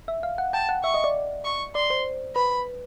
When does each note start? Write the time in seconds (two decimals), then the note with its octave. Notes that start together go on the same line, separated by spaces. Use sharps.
0.08 E5
0.23 F5
0.38 F#5
0.53 G5 A5
0.69 F#5
0.84 E5 C#6
0.94 D#5
1.04 D5
1.45 C#6
1.75 D5 C6
1.90 C5
2.36 B4 B5